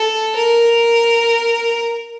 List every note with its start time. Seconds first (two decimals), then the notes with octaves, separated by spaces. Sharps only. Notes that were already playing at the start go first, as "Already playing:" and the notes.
Already playing: A4
0.36 A#4